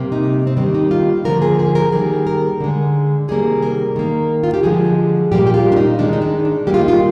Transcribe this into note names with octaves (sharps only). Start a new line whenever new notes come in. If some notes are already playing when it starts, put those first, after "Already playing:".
Already playing: C3 G3 A#3
D#4
C4
D#3 G3 A#3 D4
D#4
F4
D3 F3 A#3 A#4
G#4
G#4
A#4
D#3 G3 A#3 G#4
A#4
D3 G#3
C3 D#3 G3 A#3 G#4
A#4
D#3 A#3
F4
G4
D3 F3 G#3 G#4
A#2 G3 A#3 G4
G4
F4
D4
D#4
D#3 G#3 D4
D#4
D4
D4
D#3 G3 A#3 G4
F4
D#4
F4